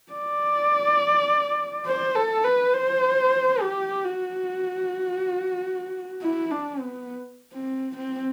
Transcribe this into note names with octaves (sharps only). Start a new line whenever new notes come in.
D5
C5
A4
B4
C5
G4
F#4
E4
D4
B3
C4
C4